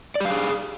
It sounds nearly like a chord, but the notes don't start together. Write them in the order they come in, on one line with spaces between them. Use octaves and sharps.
D5 G4 F5 G#4